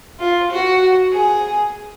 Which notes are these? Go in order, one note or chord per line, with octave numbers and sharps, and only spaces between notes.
F4
F#4
G#4